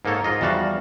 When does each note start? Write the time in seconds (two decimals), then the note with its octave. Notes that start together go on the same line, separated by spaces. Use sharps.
0.05 G#2 A#3 D#4 A4 C#5
0.24 G#2 F4 D#5
0.41 E2 F3 G3 F#4 F5 A5